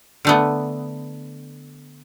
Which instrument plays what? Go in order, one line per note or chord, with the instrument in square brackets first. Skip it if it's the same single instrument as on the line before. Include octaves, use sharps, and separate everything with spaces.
[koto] D3 A3 B3